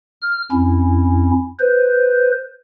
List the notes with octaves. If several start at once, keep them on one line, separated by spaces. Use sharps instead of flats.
F6
F2 C#4 E4
B4 C5